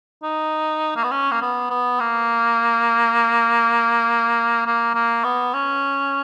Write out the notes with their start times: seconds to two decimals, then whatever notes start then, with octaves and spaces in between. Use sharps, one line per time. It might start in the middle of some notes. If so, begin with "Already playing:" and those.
0.23 D#4
0.96 A#3
1.03 B3
1.11 C#4
1.31 A#3
1.42 B3
1.70 B3
2.00 A#3
4.66 A#3
4.95 A#3
5.24 B3
5.53 C#4